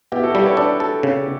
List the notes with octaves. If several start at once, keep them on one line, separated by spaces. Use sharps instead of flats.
B2 E4 G4
F#4 A4
G3 G4 B4
A4 C#5
D4 B4 D5
A4
C#3